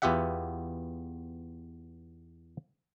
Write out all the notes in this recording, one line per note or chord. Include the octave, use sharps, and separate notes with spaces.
E2 B3 F4 G4 E5 F#5